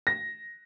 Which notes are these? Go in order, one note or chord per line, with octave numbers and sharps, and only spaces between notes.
A#6